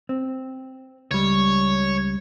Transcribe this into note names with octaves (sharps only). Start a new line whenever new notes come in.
C4
C#2 G3 C#5